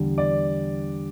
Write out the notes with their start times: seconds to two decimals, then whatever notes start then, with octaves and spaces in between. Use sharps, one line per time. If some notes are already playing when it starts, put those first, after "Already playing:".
Already playing: E2 D3 G3
0.18 D5